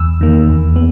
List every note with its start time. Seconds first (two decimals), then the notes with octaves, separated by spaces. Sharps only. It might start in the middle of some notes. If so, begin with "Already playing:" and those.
Already playing: E2 E6
0.21 D#3 A#3
0.49 E2
0.76 B3